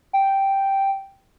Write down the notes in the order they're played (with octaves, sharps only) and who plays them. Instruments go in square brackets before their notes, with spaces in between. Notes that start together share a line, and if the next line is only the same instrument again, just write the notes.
[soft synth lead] G5